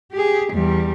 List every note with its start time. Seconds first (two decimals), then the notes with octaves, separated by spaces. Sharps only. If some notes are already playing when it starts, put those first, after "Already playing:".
0.12 G4 G#4
0.53 E2 G3